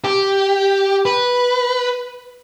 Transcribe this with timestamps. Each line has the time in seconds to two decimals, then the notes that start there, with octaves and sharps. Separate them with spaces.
0.04 G4
1.06 B4